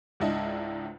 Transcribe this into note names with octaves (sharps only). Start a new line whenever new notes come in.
C#2 G#2 D4 E4 D#5 A5